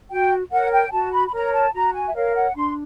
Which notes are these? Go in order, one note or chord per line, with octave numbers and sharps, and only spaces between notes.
F#4 G5
A#4 C#5 F#5
G5
F#4 A5
B5
B5
A#4 C#5 A#5
A5
F#4 A#5
G#5
E5
A#4 C#5 F5
F#5
D4 C6